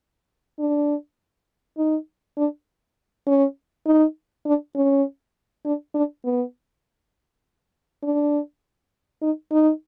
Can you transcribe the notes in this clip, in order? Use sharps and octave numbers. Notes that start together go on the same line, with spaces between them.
D4
D#4
D4
C#4
D#4
D4
C#4
D4
D4
B3
D4
D#4
D#4